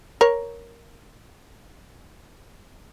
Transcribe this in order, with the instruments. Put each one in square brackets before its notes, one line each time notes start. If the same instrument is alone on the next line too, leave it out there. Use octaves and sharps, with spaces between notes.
[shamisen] A#4 C#5